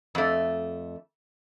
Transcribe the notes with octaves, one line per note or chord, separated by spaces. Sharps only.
F2 A3